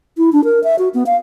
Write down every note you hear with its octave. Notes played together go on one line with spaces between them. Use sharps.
E4
D4
A#4
E5
F#4
B3
F5